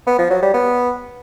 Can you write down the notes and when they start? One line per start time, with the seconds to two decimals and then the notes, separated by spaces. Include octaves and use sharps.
0.07 B3
0.19 F3
0.30 F#3
0.42 G3
0.54 B3